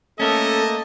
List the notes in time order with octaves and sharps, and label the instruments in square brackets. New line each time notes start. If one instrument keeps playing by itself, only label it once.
[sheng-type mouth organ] A3 A#3 A5 [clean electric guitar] C#4 A#4 [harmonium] A4 [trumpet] D#5